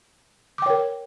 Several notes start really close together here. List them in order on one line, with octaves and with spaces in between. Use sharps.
D6 G5 C#5 A#4